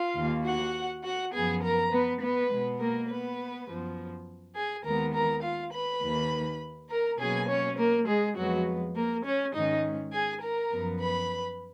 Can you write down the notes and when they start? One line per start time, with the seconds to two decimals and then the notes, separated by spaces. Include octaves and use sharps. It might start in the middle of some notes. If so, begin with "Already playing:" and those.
Already playing: F4 F5
0.15 D#2 D#3 A#3
0.44 F#4 F#5
1.03 F#4 F#5
1.33 F#2 F3 B3 G#4 G#5
1.62 A#4 A#5
1.91 B3 B4
2.21 B3 B4
2.50 B2 G#3 B3
2.80 A#3 A#4
3.08 B3 B4
3.67 F#2 F3 B3
4.55 G#4 G#5
4.84 D#2 D#3 G#3 B3 A#4 A#5
5.14 A#4 A#5
5.43 F4 F5
5.72 B4 B5
6.02 D#2 D#3 A#3
6.89 A#4 A#5
7.19 B2 F#3 A#3 C#4 G#4 G#5
7.48 C#4 C#5
7.78 A#3 A#4
8.07 G#3 G#4
8.36 F2 F3 F#3 G#3 B3 F#4
8.95 A#3 A#4
9.24 C#4 C#5
9.54 G#2 D#3 G#3 C#4 D#4 D#5
10.12 G#4 G#5
10.41 A#4 A#5
10.70 F#2 F3 B3
11.00 B4 B5